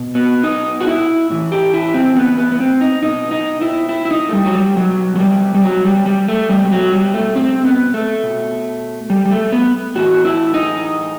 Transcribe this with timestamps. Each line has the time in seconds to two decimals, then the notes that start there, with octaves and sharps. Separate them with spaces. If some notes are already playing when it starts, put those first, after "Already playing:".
Already playing: B2
0.15 B3
0.43 D#4
0.80 F#4
0.87 E4
1.30 A2 E3
1.52 G4
1.74 E4
1.94 C4
2.17 B3
2.38 B3
2.52 B3
2.60 C4
2.81 D#4
3.03 B2 D#4
3.31 D#4
3.61 E4
3.89 E4
4.05 E4
4.11 D#4
4.29 A3
4.33 G3
4.45 F#3
4.55 G3
4.76 B2 F#3
5.16 F#3
5.19 G3
5.55 G3
5.63 F#3
5.85 G3
6.06 G3
6.28 A3
6.49 B2 G3
6.66 G3
6.72 F#3
6.92 G3
7.14 A3
7.36 C4
7.65 B3
7.94 A3
8.23 B2
9.10 G3
9.26 G3
9.31 A3
9.52 B3
9.95 A2 E3 F#4
10.25 E4
10.54 D#4